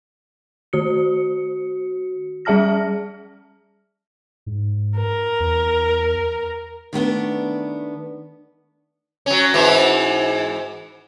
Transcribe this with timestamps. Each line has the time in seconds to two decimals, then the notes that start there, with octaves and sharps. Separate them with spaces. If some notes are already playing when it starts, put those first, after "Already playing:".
0.73 D#3 F#4 C#7
2.45 G3 G#4 E5 A5 F6 A#6
4.46 G#2
4.97 A#4
5.40 E2
6.93 D#3 A3 B3 D4
9.26 F#3 C#4
9.54 G#2 E3 E4